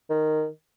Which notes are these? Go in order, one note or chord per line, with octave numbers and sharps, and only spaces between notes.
D#3